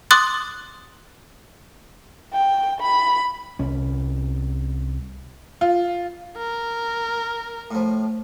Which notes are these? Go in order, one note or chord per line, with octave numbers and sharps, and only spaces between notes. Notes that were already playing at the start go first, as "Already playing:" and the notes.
C6 D6 D#6 F#6 A6
G5
B5
C2 C#4
F4
A#4
A2 F3